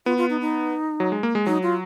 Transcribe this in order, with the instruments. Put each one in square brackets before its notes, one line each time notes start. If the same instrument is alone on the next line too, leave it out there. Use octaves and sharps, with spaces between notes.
[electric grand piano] B3 [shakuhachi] F4
[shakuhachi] F4
D#4
D#4
[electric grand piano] F#3
G#3
A#3
G#3
[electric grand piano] F#3 [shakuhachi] D#4
[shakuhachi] F4